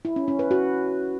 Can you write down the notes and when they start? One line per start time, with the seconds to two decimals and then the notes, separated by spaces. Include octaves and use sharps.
0.05 E4
0.16 C#4
0.28 C#4
0.39 B4
0.51 F#4